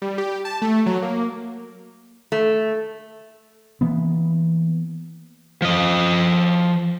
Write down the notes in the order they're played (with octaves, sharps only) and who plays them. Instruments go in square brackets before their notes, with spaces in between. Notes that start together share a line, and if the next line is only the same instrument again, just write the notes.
[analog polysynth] G3
G4
A5
A3
F#3
A#3
[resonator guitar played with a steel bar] A3
[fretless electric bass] E3 A#3 B3
[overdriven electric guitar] F3 D#5